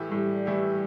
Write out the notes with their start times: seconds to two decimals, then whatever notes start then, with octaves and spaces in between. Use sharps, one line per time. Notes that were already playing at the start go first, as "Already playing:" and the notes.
Already playing: A2 E3 A3 E4 G4
0.11 A2 G3
0.46 E3 A3 E4 G4